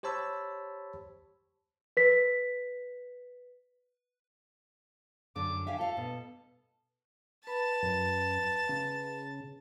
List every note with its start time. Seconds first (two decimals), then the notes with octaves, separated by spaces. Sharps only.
0.03 G4 C5 C#5 A5 B5 E6
1.97 B4 B6
5.36 F#2 D3 D6
5.67 G4 E5 F5 G#5
5.78 F4 A4 F5
5.97 B2
7.47 B4 A5 B5 A6
7.83 F#2
8.69 C#3